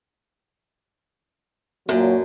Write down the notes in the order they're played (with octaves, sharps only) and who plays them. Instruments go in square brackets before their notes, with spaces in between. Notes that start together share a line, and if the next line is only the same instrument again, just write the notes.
[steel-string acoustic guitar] F#2 D3 [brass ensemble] A#2 F#3